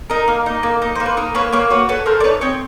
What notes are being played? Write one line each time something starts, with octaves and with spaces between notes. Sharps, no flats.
D#4 A#4
A#3
D#4
A#3
D#4
A#3 C5
B4
D#4 A#4
A#3 B4 C#5
A#3 B4 C#5
F#4 B4 C#5
A4 B4 C#5
A4 A#4 C5
D5
D#4 B4 C#5
C4 C#5 D#5